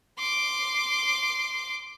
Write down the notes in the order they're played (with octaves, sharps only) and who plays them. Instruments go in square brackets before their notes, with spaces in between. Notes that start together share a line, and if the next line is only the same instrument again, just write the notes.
[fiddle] C6 D6